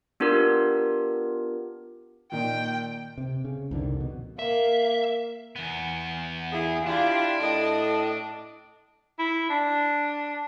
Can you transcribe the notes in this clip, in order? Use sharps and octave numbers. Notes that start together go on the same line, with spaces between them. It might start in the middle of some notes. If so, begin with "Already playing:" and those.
B3 D4 F4 G4 A#4
A#2 D#3 D#4 G5
C3
C#3
C2 F2 D3 D#3
B2
A#3 E5
E2 B3
E4 G#4
D4 E4 F4 G4
A2 A4 D#5
E4
D4